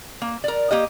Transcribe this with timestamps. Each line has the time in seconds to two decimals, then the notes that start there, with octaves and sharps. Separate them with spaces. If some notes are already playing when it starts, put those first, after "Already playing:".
0.22 A#3
0.44 A#4 D5
0.71 A#3 G4 D#5